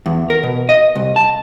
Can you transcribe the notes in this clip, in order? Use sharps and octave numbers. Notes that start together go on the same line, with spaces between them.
E2
A#4
B2
D#5
C2
A5